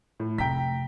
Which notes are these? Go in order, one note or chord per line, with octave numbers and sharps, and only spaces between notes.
A2
F1 G5 A#5 B6